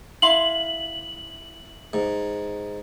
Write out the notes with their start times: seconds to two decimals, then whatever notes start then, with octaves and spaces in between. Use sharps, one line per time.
0.22 E4 F5 C6 F#7
1.93 G#2